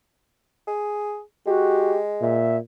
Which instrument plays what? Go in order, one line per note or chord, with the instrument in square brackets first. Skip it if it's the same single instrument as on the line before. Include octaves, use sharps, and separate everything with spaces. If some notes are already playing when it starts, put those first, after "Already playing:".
[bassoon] G#4
[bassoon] G#3 [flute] F#4 [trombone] G4
[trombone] A#2 [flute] E5